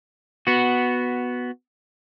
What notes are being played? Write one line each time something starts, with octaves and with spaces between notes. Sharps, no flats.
B3 F#4